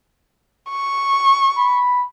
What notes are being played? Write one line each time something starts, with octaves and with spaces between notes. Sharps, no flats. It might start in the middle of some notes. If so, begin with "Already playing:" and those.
C#6
B5